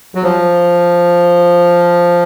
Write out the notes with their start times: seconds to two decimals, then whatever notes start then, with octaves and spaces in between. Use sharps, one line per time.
0.15 F#3
0.23 F3